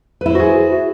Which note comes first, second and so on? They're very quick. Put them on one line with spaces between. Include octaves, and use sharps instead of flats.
B4 E4 C5 F#4 G#4